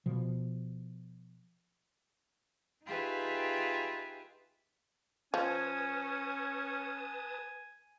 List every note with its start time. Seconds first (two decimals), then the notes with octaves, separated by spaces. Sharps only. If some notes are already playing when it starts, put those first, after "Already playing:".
0.06 B2 F3
2.85 D#4 F4 G4 G#4 B4 E5
5.34 F3 C#4 B4 G#5 A5 D#6